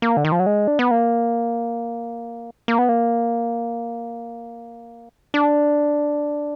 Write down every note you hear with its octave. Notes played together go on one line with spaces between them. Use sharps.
A#3
D3
D#3
F3
F#3
G#3
D4
B3
A#3
A#3
B3
A#3
D4